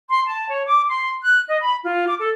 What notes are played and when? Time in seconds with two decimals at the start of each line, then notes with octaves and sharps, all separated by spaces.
0.09 C6
0.26 A5
0.48 C#5
0.66 D6
0.88 C6
1.22 F#6
1.48 D#5
1.62 B5
1.84 F4
2.07 D6
2.19 A4